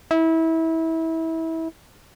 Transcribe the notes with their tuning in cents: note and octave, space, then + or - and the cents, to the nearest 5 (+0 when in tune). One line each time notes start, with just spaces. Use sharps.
E4 -25